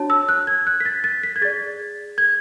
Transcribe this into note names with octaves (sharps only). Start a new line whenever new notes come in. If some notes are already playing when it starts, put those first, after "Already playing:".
Already playing: D4 F#4 C#5 A5
E6
F#6
G#6
F#6
B6
A6
A6
B6
G#6
G#4 D5 A6
G#6